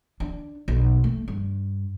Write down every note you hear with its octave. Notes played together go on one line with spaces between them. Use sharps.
D4
B1
A3
G2